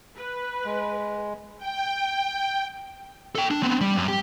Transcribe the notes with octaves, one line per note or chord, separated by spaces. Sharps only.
B4
G#3
G5
A4 G5
D4
B3 C4
G3
F#2
G4